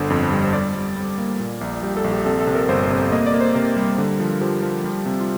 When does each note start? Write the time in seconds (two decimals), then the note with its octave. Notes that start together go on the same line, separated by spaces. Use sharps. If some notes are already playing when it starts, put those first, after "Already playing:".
Already playing: G1 D3 C5
0.10 F2
0.32 G3
0.44 C5
0.53 G3 D5
0.75 G3
0.96 G3
1.18 A#3
1.40 A#2
1.61 A#1
1.83 G3 G4
1.97 A4
2.04 A#1
2.11 G4
2.26 C3 A4
2.40 A4
2.47 C3
2.55 A#4
2.69 G1 C5
2.90 C3
3.12 A#3 D#5
3.26 D5
3.34 A#3
3.41 C5
3.55 C3 A#4
3.76 G3
3.98 D3
4.20 F3
4.31 F4
4.41 F3 G4
4.62 F3
4.84 G3
5.06 C3
5.20 F4